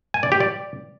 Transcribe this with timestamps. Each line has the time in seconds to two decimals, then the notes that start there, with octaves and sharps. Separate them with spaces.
0.14 G#5
0.23 D5
0.32 G4
0.40 D5